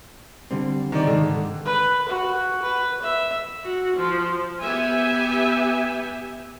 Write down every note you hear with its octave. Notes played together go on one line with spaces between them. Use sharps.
D3 G3 C4
D#3 D5
G#2 D3 D#3
B4
F#4
B4
E5
F#4
F3
B3 G4 E5 G#5